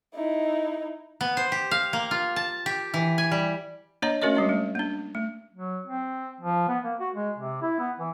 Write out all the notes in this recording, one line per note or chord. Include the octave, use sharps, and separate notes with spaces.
D#4 E4
B3
C5
G4
F5
A#3
F4
A5
G4
E3
G#5
G3
A#3 D4 C#5 D#5 A#5
A3 C#4 F#4 A#4 C#5 D#5
G3 G#3 D4 F#4
A3
A#3 D4
A3
F#3
C4
F3
B3
A#3
F#4
G#3
C3
E4
B3
E3